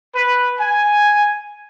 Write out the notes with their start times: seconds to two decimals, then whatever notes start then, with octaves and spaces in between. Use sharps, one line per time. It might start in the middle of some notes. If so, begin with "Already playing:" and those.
0.14 B4
0.59 G#5